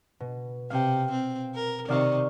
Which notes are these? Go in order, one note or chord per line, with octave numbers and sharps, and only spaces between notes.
B2
C3 F5 G5
C4
A#4
C3 D#3 D5 F5 C#6